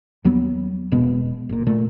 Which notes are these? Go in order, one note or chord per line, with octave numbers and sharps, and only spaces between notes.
D#2 F#3 G3 B3
E1 B2 G#3 B3
F#1 A#2
A#2 A3